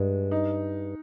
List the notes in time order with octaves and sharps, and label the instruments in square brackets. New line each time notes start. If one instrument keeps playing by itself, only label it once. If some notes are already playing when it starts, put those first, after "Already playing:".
Already playing: [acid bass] G2 [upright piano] G#3
[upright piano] D#4